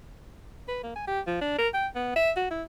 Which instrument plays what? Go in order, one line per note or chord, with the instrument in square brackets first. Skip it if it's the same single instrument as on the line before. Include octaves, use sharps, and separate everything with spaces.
[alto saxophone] B4
A#3
G#5
G4
F3
D4
A#4
G5
B3
E5
F#4
E4